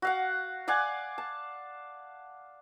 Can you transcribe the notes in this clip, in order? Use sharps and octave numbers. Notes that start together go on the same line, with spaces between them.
F#4 F5 F#5
D5 F5 F#5 G#5
A5